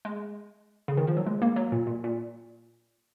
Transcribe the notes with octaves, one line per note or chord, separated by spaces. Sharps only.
G#3
C#3
D#3
F3
F#3
G#3
A#3
F#3
A#2
A#2
A#2